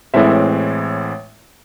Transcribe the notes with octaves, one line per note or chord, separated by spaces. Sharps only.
A1 A2 G#3 C4 E5